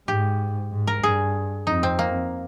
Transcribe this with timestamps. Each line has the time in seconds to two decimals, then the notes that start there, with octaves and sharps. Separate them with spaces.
0.08 G#2 G4
0.71 G#2
0.87 A#4
1.03 G2 G#4
1.67 F2 D#4
1.83 C4
1.99 A#3